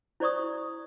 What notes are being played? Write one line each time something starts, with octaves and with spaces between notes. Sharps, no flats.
E4 C5 D5 C#6 D#6